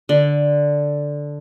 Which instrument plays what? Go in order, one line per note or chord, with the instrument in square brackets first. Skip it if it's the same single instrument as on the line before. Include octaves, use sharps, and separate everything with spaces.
[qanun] D3